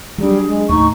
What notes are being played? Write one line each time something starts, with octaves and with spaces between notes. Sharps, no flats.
F#3 G3 D4 G#4
G#3
D#2 A2 A3 D#4 C#6